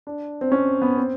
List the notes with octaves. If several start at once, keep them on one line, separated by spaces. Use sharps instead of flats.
D4
C4
C#4
B3
C4